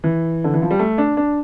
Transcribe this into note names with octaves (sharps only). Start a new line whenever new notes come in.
E3
D3
E3
F3
G3
A3
D4
D4